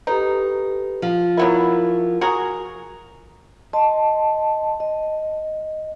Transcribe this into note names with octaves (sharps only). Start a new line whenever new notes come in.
D#4 G4 A4 B4
F3
F#3 B3 E4 A#4
F#4 G#4 A#4
D#5 A5 C6
D#5